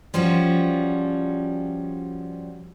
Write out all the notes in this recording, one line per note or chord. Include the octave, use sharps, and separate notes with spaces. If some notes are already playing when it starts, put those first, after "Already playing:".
F3 G3 C#4 F4 F#4